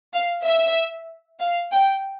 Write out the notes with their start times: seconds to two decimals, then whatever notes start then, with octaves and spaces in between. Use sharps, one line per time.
0.14 F5
0.45 E5
1.40 F5
1.72 G5